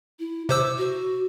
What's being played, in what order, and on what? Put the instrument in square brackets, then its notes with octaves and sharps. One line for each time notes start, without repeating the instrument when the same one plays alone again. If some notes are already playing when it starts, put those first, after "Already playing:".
[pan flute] E4
[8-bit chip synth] C3 C5 E6 [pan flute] D6
[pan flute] F#4